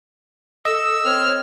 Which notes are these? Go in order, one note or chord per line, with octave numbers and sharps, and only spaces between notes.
A4 D#5 E6
C4 C#5 F6